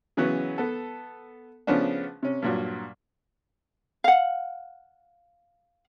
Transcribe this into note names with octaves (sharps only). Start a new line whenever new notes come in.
C#3 E3 F#3 B3 C#4
B3 A4
C#3 F3 A3 B3 C#4 D4
C3 C#4
G2 A#2 F#3
F5 F#5